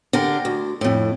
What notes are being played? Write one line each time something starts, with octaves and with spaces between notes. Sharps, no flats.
D3 G4 A#4
D2
F2 A2